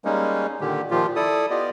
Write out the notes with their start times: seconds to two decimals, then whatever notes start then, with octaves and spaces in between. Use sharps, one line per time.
0.05 G3 G#3 A#3 C#4 D#4
0.61 A#2 D3 D#3 G4
0.91 A#2 D#3 F3 F4 G4
1.16 E4 A4 D5 D#6
1.50 B3 F4 G4 D5 D#5